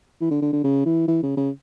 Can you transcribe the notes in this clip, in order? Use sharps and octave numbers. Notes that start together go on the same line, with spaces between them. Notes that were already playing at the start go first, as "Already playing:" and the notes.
E3
D3
D3
D3
C#3
E3
E3
C#3
C#3